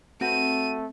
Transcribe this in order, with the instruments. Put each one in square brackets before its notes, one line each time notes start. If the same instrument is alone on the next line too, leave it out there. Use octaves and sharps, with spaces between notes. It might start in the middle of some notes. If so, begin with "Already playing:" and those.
[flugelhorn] A3 [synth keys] C4 [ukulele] F#4 B4 [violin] D#7